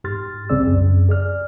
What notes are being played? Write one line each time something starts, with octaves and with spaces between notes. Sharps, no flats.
G#2 G4 C6 F6 A6
C2 C#3 C4 G#4 D5 E6
F#2
G#4 D5 F6